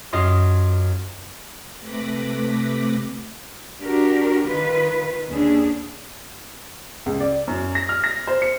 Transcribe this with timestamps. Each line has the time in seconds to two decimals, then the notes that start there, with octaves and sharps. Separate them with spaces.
0.13 F#2 F4 D#5 C6
1.79 C3 A3 B4 B5 D6 A#6
3.81 D4 F#4 G4 A#4
4.48 D#3 F4 B4
5.31 D#2 C#4 D4 G#4
7.06 C#2
7.20 D5
7.48 F#2
7.75 A#6
7.89 F6
8.04 A#6
8.27 C5
8.42 C#7